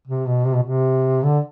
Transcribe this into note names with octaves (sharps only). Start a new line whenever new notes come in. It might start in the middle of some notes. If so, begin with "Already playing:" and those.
C3
B2
C3
B2
C3
D3